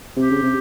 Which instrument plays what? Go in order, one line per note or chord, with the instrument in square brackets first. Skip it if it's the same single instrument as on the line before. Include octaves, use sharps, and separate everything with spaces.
[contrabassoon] C3 [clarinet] G4
[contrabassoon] C#3
C3